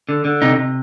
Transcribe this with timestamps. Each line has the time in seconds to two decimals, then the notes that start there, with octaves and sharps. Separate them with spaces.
0.09 D3
0.25 D3
0.42 C3 D#4
0.58 C3